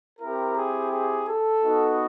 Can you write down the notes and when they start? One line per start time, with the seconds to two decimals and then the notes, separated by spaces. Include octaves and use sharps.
0.19 C4 E4 G4 A#4
0.56 G#4
0.91 G#4
1.27 A4
1.62 B3 D#4 F#4